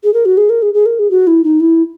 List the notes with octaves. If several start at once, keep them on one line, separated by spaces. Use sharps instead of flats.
G#4
A#4
F#4
G#4
A#4
G#4
G#4
A#4
G#4
F#4
E4
D#4
E4